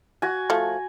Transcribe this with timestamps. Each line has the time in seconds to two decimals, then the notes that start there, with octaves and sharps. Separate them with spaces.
0.22 F#4 G#5
0.50 F3 A3